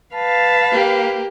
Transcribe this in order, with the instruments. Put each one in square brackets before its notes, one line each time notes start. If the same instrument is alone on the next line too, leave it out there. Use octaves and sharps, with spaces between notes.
[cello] B4 F5 [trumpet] A5
[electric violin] A#3 G4